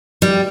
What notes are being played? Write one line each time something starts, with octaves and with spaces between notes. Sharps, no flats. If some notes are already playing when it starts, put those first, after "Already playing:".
G3